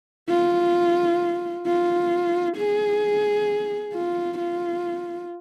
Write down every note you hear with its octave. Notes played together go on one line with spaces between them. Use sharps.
F4
F4
G#4
F4
F4